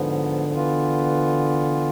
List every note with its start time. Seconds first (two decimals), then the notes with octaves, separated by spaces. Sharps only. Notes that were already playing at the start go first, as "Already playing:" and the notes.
Already playing: G#2 D3 F3 B3
0.53 E3 B3 F4